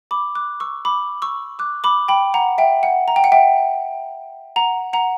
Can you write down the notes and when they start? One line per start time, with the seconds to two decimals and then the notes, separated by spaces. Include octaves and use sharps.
0.11 B5 D6
0.35 D6 F#6
0.60 C#6 E6
0.85 B5 D6
1.22 C#6 E6
1.59 D6 F#6
1.84 B5 D6
2.08 G5 B5
2.34 F#5 A#5
2.58 E5 G5
2.83 F#5
3.08 A#5
3.16 G5
3.24 F#5
3.32 E5 G5
4.56 F#5 A#5
4.93 F#5 A#5